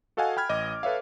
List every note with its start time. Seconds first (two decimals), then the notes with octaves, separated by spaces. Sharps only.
0.17 F#4 A4 D#5 F5 F#5 G#5
0.37 G5 B5 F6 G#6
0.49 A1 D#5 D6
0.83 A4 B4 C#5 E5 F5